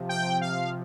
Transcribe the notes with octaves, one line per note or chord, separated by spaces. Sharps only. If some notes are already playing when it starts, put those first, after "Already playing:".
Already playing: C3 F3
G5
F5